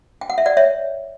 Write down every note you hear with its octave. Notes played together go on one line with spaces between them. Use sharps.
G5
F#5
E5
D5 F#5
C#5 E5